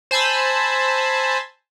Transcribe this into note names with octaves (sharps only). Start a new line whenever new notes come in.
C5 G#5 A5 B5 E6